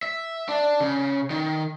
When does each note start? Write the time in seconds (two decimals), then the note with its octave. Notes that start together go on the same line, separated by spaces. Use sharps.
0.03 E5
0.49 D4
0.80 C#3
1.30 D#3